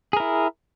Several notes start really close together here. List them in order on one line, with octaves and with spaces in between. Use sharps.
G#4 A#4 E4